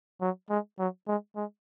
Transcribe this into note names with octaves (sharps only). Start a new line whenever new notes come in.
F#3
G#3
F#3
G#3
G#3